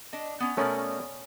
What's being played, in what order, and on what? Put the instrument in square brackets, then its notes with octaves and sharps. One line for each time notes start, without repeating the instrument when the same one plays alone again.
[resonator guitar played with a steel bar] D4 D#5
B3 C#4
[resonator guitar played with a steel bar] B2 B3 D5 [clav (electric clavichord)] A3 C#4 A#4